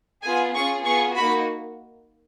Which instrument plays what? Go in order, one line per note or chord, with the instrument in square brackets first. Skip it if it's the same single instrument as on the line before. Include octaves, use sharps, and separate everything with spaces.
[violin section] B3 F4 G#4 G#5
C#4 F4 G#4 C#6
B3 F4 G#4 C#6
A#3 D#4 F#4 B5